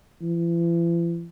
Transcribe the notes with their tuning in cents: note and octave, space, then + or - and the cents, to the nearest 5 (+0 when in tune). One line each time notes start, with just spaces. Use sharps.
E3 +45